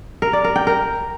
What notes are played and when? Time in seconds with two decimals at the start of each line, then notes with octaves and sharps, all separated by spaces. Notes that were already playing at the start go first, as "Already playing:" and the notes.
0.22 A#4
0.33 D5
0.44 A#4
0.56 G5
0.67 A#4